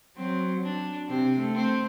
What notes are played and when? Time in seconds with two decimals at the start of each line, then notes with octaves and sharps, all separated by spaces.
0.17 F#3 C4
0.63 D4
1.08 C3 C4
1.39 A3
1.55 C4